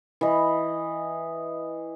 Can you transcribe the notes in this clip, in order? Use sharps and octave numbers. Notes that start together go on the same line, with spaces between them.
E3 D#5